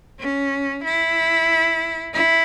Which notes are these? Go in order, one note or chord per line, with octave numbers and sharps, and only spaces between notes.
C#4
E4
E4